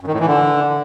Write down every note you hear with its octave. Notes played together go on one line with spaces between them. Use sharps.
F#2
D#3
A2
E3
D3